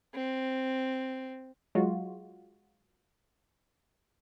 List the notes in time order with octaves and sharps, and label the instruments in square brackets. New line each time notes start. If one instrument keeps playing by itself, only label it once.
[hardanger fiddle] C4
[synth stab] F#3 G#3 F4 F#4